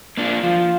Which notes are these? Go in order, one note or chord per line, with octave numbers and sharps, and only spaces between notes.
A#3 D4 F4
F3 F4